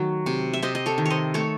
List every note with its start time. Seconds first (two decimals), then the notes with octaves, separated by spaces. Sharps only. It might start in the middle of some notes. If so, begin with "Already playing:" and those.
Already playing: D#3 F#3 A3
0.26 C3
0.53 E5
0.62 C3 C5 D#5
0.75 D#5
0.86 A4 C#5
0.98 D#3
1.06 C5 C#5 D#5
1.34 A3 A4 C#5